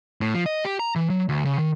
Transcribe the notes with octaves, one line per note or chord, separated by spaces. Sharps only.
A2
F3
D#5
G4
A#5
E3
F#3
D2
C#3
D#3